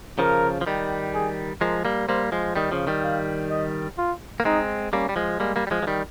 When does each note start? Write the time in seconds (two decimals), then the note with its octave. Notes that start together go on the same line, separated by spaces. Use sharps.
0.19 C#3 F3 A#4
0.61 F3
0.66 D#3 G3
1.14 G#4
1.61 F3 G#3 A#4
1.85 G3 A#3
2.08 G3 A#3 C5
2.32 F3 G#3
2.56 D#3 G3 D#5
2.72 C#3 F3
2.87 D#3 G3
3.04 F5
3.51 D#5
3.98 F4
4.40 A#3
4.45 G#3 C4 D#4
4.93 G3 A#3 C#4
5.09 G3
5.16 F3 G#3
5.40 G3 G#3 A#3
5.56 G3 A#3
5.67 G3
5.71 F3 G#3
5.83 F3
5.87 D#3 G3